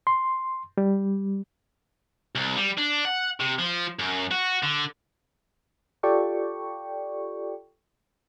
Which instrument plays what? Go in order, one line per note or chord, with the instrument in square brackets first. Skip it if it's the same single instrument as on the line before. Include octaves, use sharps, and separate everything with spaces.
[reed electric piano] C6
G3
[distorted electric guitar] C2
G3
D4
F#5
C3
F3
F#2
F#4
D3
[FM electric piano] F4 G4 A4 D5 G5 C#6